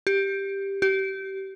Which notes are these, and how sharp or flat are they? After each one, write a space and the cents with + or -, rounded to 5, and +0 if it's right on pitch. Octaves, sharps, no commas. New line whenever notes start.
G4 +5
G4 -25